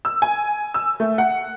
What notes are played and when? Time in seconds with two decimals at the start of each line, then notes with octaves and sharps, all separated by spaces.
0.05 E6
0.22 G#5
0.74 E6
1.00 A3
1.18 F#5